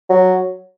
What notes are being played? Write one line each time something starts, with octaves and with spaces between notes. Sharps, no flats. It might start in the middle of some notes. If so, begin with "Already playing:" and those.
F#3